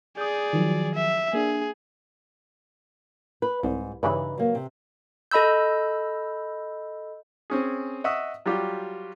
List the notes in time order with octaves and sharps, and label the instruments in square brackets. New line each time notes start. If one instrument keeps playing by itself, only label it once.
[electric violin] G#4 D5 [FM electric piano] D#6 G6
[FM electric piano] D#3 F3 F#3
[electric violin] E5
[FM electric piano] A#3 D4 [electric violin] G#4
[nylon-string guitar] B4
[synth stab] C2 [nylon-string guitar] G#2
[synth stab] G2 C#3 E3 [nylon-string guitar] D#4 B4
[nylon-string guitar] F#3 A#3
C3
[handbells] A4 D#5 B5 E6 G6
[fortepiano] C4 C#4 G#4
D#5 E5 F#5 C#6 D#6 E6
F#3 G3 F4 G4